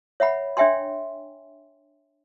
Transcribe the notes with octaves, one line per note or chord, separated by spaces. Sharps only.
C#5 E5 F#5 B5
D4 C#5 E5 G5 G#5 C6